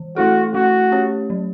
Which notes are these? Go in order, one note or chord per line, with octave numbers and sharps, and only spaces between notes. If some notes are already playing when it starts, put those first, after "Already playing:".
Already playing: E3
A3 E4 F#4 A4
A3 F#4
C#4 G4 C#5
F#3